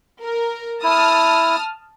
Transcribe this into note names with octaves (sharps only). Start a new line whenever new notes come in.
A#4
E4 A5 D#6 F6